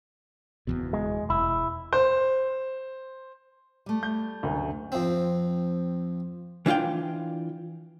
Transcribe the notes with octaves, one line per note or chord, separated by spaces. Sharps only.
F#1 E2 B2
G#3
E1 E4
C5
G3 A3
G6
F#1 D2
F2 C4
E3 D4 F4 F5 G5